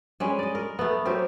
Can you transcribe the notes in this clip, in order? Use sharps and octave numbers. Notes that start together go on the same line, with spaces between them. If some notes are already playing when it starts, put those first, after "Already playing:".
G3 G#3 C#4
D5 D#5
A#4
A3 B3
F#3 C4 G4 A#4